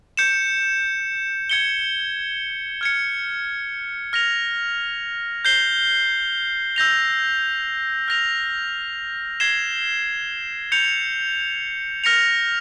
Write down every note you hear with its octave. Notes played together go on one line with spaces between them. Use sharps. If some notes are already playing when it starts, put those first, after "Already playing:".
G6 C#7 E7
G#6 C#7 G7
F6 G#6 C#7
F6 A#6 F7
G6 C7 G7
E6 G6 A#6 F7
F6 A#6 F7
G#6 C7 E7 G7
G6 C#7 F7
F6 A#6 C#7 F7